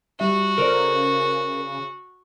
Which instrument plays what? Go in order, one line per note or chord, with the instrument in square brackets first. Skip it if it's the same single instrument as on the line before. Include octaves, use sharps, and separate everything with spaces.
[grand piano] G3 E5 [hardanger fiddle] F#4
[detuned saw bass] C#3 [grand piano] A4 C5 D5 [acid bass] A#4